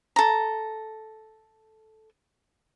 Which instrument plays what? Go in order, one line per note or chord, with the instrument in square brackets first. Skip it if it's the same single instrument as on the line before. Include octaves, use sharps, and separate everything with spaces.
[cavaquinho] A4 A#5